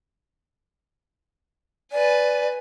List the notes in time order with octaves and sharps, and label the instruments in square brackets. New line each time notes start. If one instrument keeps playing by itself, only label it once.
[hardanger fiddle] B4 G#5 [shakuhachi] D5